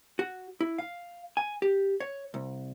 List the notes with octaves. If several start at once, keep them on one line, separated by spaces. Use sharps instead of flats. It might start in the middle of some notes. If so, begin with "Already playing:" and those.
F#4
E4
F5
G#5
G4
C#5
C2